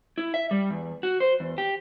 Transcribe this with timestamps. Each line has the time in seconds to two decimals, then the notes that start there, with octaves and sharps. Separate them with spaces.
0.18 E4
0.34 E5
0.51 G3
0.70 E2
1.03 F#4
1.20 C5
1.40 E2
1.58 G4